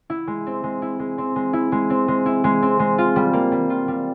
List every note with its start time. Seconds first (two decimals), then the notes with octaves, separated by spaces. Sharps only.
0.10 E4
0.27 G#3
0.47 C4
0.64 G#3
0.82 E4
0.99 G#3
1.18 C4
1.36 G#3
1.53 E4
1.72 G#3
1.90 C4
2.08 G#3
2.26 E4
2.44 G#3
2.62 C4
2.79 G#3
2.98 F4
3.16 G3
3.33 A#3
3.52 G3
3.70 F4
3.88 G3